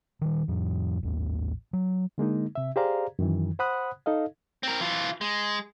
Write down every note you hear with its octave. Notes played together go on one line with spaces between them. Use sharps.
D#3 G3
F2 A2 F3
A1 D#2
F#3
D3 G#3 A#3 D#4
C3 E5
G4 G#4 C5 D5 F5 A#5
F#2 D#3 E3
C5 F#5 B5 D#6 F#6
D#4 A4 D#5 F5
C4 A#4
E3 F4
G#3